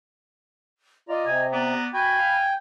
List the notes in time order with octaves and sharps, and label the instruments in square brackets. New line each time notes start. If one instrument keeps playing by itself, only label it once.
[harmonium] F4 D5 [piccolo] D#5 [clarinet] A#5
[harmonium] C3 [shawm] G#5
[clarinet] B3 [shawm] D5 [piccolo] A#5
[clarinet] F#4 [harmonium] G5 [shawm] G#5 [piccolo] B5
[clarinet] F5